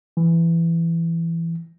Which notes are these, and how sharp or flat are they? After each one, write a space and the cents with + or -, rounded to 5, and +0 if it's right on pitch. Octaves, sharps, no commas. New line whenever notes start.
E3 +15